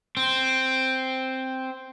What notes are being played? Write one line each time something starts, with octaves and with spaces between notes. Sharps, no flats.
C4